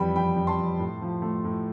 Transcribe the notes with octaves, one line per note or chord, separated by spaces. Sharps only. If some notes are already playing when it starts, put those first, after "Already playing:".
Already playing: F2 E3 G3 G5 B5
F2 G5 B5
F2
A5 C6
F2
A2
F3
A3
A2